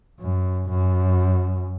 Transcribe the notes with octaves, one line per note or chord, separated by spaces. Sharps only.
F#2
F#2